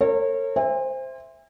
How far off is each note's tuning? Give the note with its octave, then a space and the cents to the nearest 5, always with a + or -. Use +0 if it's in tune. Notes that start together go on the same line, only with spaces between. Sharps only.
A#4 -40 C#5 -30
C5 +0 E5 +0 G#5 -45